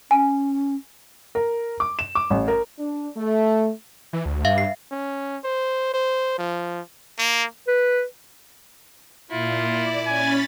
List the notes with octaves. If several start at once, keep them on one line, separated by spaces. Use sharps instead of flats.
C#4 G#5
A#4
D6
E7
D6
A1
A#4
D4
A3
E3
D2
G2 E5 F5
C7
C#4
C5
C5
F3
A#3
B4
A#2 E4 F4
D5
C#4 G#5 B5 A6